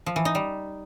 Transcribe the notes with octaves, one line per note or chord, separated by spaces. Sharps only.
F3
E3
D#4
G3